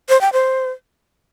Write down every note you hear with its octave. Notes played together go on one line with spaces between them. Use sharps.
C5
G5
C5